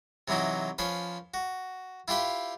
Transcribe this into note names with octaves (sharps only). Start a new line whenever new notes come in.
C3 E3 F#3 D#4 E4
F3 C#4 B4 C5
F#4
E4 F4 G4 B4 F5